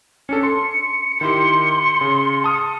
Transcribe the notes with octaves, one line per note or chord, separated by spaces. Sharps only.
C#4 D4 A4 C#7
C6 C#7
D#3 E4 G4 C6
C#3
A5 D#6 F6